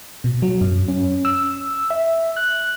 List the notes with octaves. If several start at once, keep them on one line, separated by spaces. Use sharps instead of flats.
B2
F#3
F#2
C#4
E6
E5
F#6